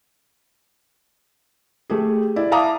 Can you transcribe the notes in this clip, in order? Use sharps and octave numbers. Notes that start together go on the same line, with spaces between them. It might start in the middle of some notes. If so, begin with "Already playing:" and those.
A3 G4 G#4
E4 D5
E5 F5 A5 A#5 D6 D#6